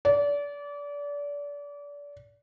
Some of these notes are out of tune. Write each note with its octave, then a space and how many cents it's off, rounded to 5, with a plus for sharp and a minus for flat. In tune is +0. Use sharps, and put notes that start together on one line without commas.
D5 -30